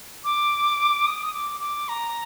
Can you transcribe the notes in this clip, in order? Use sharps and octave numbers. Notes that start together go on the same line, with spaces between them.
D6
D#6
D#6
D6
D6
A#5